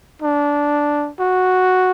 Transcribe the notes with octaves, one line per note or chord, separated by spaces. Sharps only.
D4
F#4